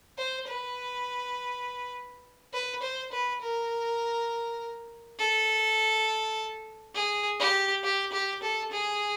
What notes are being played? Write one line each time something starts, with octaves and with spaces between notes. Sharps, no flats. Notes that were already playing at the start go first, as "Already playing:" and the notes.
C5
B4
B4
C5
B4
A#4
A4
G#4
G4
G4
G4
A4
G#4